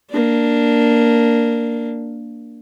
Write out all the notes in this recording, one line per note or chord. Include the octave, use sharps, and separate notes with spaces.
A#3 D4